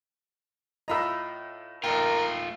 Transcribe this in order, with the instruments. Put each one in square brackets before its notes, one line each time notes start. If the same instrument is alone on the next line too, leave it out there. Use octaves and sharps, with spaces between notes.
[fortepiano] A2 F4 A#5 [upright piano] D#5 B5 E6
[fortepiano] A#1 G5 [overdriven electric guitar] A3 F4 [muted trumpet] A#4